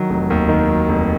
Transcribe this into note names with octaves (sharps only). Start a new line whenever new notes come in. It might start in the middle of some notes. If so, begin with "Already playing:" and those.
Already playing: D#3 F#3
F1
D#2
D#3
F#3
F1